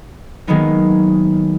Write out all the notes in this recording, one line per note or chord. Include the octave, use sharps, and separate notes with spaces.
D#3 F#3 G#3 A#3 B3 D#4